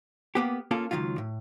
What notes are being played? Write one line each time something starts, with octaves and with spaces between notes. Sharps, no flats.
A#3 B3 G4
A#3 C#4 F4 A4
C#2 F#2 D#3 F#3 F4
A2